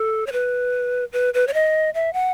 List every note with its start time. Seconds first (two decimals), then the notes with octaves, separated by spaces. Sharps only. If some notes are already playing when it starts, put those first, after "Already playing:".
Already playing: A4
0.27 C#5
0.32 B4
1.13 B4
1.34 B4
1.47 C#5
1.54 D#5
1.94 E5
2.13 F#5